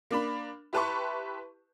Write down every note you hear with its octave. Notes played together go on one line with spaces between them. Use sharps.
A#3 D4 B5
E4 G4 B4 A5 C6 C#6